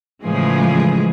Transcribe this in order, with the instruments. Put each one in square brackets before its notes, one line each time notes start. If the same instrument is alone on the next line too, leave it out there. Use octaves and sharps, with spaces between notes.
[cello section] A2 C#3 E3 F3 G#3 G#4